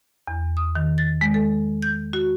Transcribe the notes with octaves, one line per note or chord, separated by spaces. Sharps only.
E2
D#6
D#3
A6
G#3
A4
G6
F#4